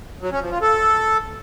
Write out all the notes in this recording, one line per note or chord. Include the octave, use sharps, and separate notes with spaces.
F#3
C#4
F3
F4
A4